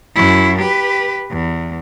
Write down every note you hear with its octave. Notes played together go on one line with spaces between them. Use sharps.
F#2 E4
G4 B4
E2